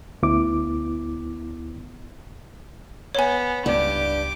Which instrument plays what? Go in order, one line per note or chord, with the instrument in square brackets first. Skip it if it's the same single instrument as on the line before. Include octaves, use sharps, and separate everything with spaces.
[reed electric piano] D2 B3 E4 D6
[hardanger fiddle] B3 [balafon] C#5 G#5
[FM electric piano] C#2 D5 [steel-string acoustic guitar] G2 [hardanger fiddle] G4 D6